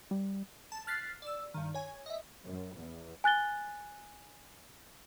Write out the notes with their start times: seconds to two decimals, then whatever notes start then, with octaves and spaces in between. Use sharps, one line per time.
0.11 G3
0.72 A5
0.87 F6 F#6 A6 B6 C7
1.22 D5 E6
1.54 G2 D#3
1.74 C#5 G#5
2.06 D#5 E5
2.44 F#2
2.76 E2
3.24 G#5 F#6 A6 G7